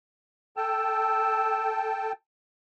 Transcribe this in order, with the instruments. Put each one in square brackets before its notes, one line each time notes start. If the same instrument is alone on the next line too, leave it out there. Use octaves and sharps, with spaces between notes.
[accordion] A4 G5 A5 [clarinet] E6